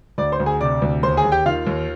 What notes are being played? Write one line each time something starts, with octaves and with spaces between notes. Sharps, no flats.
D2 D5 D6
C5 C6
D2
G#4 G#5
C3 D5 D6
D2
D#2 C5 C6
G#4 G#5
D#2
G4 G5
D#3 F4 F5
D#2